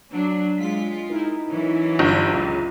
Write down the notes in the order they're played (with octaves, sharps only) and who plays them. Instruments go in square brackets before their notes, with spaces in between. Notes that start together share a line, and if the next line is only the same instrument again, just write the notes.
[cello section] F#3 D4
[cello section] G#3 F4 [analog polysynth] B6
[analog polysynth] D#4 E4 A#4
[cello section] E3 F#3 C#4
[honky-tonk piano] G1 [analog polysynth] F4 A#5 D#7
[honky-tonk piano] C#2